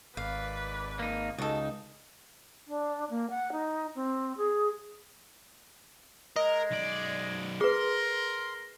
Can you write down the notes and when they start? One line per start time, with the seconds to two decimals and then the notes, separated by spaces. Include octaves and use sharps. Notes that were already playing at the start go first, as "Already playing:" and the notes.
0.17 G#1 B4 D5 F5
0.99 A#3 D#4
1.38 C#2 D#4 F#4 A4
2.67 D4
3.10 A#3
3.30 F#5
3.52 D#4
3.95 C4
4.37 G#4
6.36 G#3 A#4 D#5
6.71 B1 D5
7.61 G#4 A#4 B4 C6